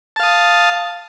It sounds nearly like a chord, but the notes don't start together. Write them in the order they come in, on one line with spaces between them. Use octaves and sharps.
A5 F5 D#6